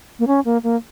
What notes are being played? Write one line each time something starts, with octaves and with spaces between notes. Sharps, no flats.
A#3
C#4
A#3
A#3